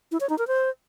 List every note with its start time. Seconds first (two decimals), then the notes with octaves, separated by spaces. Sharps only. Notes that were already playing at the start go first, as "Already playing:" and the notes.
0.12 E4
0.21 C#5
0.30 D#4
0.39 A#4
0.47 C5